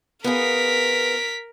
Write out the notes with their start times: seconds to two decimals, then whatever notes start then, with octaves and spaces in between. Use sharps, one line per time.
0.24 B3 F4 G#4 A#4 B6